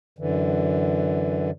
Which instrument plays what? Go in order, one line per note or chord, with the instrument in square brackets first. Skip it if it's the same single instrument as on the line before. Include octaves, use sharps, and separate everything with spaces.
[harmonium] F#2 D3 E3